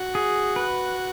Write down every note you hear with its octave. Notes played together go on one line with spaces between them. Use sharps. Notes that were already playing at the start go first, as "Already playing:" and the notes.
Already playing: F#4
G#4
B4